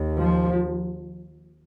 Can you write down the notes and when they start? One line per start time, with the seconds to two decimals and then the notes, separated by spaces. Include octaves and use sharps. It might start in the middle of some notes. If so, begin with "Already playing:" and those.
Already playing: D#2
0.19 F3